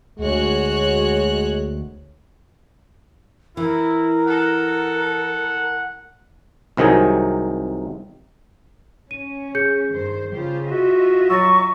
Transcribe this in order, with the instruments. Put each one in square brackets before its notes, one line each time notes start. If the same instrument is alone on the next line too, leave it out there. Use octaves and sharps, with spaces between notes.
[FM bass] D2 [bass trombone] G#3 [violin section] F#4 C#5 F#6
[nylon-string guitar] E3 [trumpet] E4 [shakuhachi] A#4
[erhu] A4 [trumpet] F#5
[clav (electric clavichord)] C2 C3 D#3 F#3 G#4
[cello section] C#4 [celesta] D#7
[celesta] G#4 G6 C#7
[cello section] G2 D#3 C5
[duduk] C#3 [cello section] F4 G4 C5
[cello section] F4 D#5 E5 [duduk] F#4
[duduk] F#3 [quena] C#6 [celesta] E6 A6 A#6